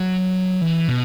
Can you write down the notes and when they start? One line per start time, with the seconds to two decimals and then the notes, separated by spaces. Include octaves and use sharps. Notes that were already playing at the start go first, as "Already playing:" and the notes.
Already playing: F#3
0.61 E3
0.88 B2